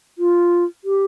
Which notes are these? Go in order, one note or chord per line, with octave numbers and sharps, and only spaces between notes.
F4
G4